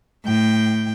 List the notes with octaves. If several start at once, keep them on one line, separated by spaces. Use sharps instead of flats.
A2 G5